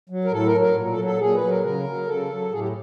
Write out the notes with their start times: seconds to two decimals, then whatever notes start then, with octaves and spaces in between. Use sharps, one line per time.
0.10 F#3
0.25 A#4
0.32 A2 A4
0.46 A#4
0.54 F#3
0.60 A#4
0.75 A#2
0.90 A4
0.97 F#3
1.04 A4
1.20 A#2 G#4
1.35 B4
1.41 F#3
1.49 A#4
1.64 C#3 A#4
1.85 F#3
2.07 C#3 A4
2.30 F#3
2.52 A2 G#4
2.60 G4